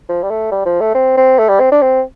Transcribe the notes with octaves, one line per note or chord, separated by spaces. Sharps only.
F3
G3
A3
G3
F3
A3
C4
C4
A3
G3
C4
D4
C4